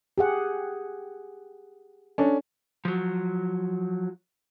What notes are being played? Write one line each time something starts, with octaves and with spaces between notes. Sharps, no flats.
G4 G#4 F#5
C#4 D4 A4
F3 F#3